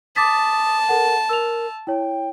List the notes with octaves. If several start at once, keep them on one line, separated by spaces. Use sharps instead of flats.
A5 D6 D#6 A6 B6
A4 A#4 F#5
A#4 E6 F7
E4 C#5 G5